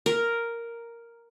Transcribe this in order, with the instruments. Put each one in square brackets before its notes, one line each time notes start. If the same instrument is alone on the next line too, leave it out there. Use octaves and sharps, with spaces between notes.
[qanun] A#4